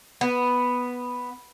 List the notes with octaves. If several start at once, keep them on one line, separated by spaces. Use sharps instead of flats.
B3